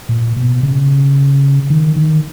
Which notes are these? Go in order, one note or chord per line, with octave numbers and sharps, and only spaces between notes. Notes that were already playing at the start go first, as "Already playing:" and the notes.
A#2
B2
C#3
D#3
D#3